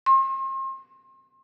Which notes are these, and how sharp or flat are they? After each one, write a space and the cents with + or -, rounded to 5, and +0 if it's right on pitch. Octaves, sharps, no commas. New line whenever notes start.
C6 +40